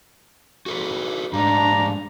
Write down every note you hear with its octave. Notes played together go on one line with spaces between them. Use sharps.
F#4 A4 B4
G#2 G3 D4 A#5